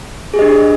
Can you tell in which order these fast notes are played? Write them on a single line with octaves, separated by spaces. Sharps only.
G#4 G4 D#5 D4